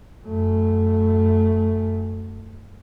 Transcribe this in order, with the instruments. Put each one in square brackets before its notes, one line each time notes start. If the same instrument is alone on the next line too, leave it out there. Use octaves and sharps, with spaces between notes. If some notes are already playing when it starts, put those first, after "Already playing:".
[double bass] F#2 A3